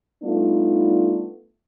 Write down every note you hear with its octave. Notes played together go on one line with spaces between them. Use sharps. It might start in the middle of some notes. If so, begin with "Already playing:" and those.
G3 A3 B3 D4 D#4 F4